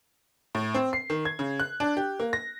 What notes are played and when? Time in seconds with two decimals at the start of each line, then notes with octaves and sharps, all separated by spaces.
0.55 A2
0.74 C4
0.93 C7
1.10 D#3
1.25 G#6
1.39 C#3
1.60 F#6
1.80 D4
1.97 G4
2.20 A#3
2.33 A#6